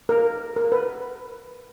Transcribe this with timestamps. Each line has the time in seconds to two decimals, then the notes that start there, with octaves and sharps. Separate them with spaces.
0.09 A#4
0.56 A#4
0.72 B4